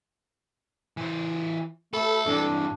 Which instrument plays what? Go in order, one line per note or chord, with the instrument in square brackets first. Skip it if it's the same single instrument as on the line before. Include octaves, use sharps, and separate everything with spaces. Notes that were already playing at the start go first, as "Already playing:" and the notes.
[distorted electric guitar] E3 C5
[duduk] A3 [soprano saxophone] A4 [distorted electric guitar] B5
[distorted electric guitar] G2 E3 [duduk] D4